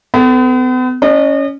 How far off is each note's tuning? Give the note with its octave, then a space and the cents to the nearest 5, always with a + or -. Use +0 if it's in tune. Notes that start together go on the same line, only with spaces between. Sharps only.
B3 +45 A4 +10
C#4 +5 D#5 -40